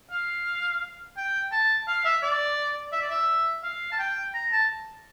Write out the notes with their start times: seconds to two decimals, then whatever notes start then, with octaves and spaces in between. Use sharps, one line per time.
0.11 F5
1.17 G5
1.52 A5
1.87 F5
2.05 E5
2.23 D5
2.92 E5
3.01 D5
3.11 E5
3.63 F5
3.92 A5
3.99 G5
4.34 A#5
4.52 A5